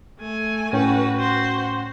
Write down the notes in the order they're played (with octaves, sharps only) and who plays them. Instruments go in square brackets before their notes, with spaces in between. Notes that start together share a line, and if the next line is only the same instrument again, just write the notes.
[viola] A3 G#5
[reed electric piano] A2 C#4 G5 [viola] F#4 B4
[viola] F#4 C5